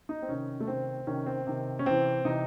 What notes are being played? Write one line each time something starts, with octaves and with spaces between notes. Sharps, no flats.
D#4
C4
C3 D#3 C#4
A3
C3 D#3 C4
C3 D#3 C#4
C4
C3 D#3
C#4
C3 E3 C4
C3 E3 D#4